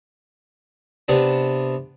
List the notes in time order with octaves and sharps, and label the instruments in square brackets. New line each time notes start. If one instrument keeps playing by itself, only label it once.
[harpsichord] C3 B3 D4